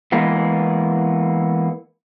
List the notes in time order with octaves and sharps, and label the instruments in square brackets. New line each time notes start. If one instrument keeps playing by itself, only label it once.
[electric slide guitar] E3 G#3 A#3 B3